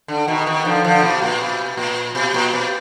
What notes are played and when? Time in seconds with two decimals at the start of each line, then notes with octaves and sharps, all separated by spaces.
0.08 D3
0.28 B2 D#3
0.47 B2 D#3
0.65 D3 F3
0.84 D3 F3
1.03 B2
1.22 A#2
1.41 B2
1.77 A#2
2.15 B2
2.34 A#2
2.54 B2